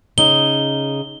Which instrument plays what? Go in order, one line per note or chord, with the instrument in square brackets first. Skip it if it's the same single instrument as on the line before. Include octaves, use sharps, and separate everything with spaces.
[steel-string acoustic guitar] C#3 D#4 [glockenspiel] G7